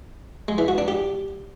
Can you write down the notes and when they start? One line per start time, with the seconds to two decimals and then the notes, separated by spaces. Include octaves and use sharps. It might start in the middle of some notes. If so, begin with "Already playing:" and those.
0.48 G#3
0.58 E3
0.68 F#4
0.78 D4
0.88 G4